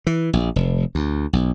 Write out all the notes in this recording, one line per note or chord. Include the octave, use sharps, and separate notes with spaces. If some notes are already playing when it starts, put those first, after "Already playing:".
E3
A#1
F1
D2
B1